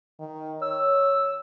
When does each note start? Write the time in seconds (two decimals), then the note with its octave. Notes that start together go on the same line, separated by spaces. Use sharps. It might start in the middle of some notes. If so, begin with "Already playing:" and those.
0.20 D#3
0.62 C#5 E6